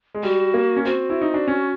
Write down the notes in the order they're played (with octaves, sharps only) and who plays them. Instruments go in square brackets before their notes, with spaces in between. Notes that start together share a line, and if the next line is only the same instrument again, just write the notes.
[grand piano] G#3
[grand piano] G3 [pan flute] F#4
[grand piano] A#3
C#4
[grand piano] C4 [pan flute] F#4
[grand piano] E4
D#4
D4
C#4